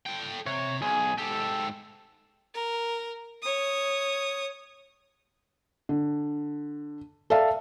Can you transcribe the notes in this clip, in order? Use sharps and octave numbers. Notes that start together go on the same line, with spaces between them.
A4 G5
C3 C#5
B1 G#4
G#2 G4 A4
A#4
C#5 D#6
D3
A4 D5 E5 F5 A5